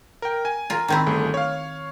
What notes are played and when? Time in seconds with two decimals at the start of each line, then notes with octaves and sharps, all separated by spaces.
0.22 A#4 G5
0.45 G#5
0.70 F4 A#4
0.88 D#3 C4 E4
1.07 G1 A3 G#4
1.34 C#5 F5